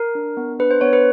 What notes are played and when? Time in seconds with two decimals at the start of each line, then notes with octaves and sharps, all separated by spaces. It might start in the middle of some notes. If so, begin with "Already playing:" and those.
Already playing: A#4
0.15 D4
0.37 B3
0.59 D4 B4
0.71 C5
0.81 B3 C#5
0.93 B4